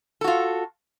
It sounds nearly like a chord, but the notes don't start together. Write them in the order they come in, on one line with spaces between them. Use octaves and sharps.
A4 F#4 F4